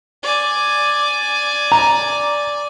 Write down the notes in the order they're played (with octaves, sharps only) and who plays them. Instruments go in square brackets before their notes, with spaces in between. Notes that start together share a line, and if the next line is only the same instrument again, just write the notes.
[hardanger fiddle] D5 G#5
[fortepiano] A#5